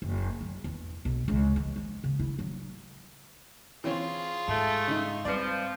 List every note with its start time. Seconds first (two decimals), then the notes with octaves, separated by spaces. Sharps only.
0.02 F#1
0.41 F#3
0.64 E2
1.05 B1
1.28 C#2
1.56 E3
1.76 F3
2.04 C#3
2.19 E4
2.39 F#3
3.84 E3 C4 C#4 F4 G#4
4.48 G#2 A3
4.88 C#3 D#4
5.25 F3 G3 C4 B4 D5